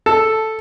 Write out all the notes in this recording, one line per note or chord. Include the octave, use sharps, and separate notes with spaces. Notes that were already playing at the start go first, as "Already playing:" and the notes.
A4